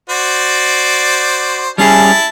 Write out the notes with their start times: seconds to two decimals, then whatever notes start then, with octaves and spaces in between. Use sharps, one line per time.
0.10 F#4 C5 D5
1.78 G3 C#4 E4 G#4 A5